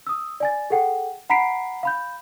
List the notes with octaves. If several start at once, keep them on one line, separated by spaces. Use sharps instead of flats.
D#6 E6
D5 G#5 A6
G#4 A4 F#5 G5
F#5 A#5 B5 B6 C7 D7
F5 B5 G6